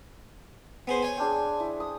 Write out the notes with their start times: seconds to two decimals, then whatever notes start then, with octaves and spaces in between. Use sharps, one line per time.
0.87 B3 G#4 C5
1.03 C#5 G#5
1.17 C4 D4 G#4
1.60 E4
1.80 D#6